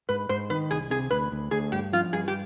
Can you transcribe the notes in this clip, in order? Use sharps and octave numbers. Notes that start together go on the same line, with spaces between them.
G#2 B4
G#2 C5
D#3 B4
C2 G#4
C3 G#4
D2 B4
D2
D2 G#4
G2 G4
F3 F4
G2 G#4
G4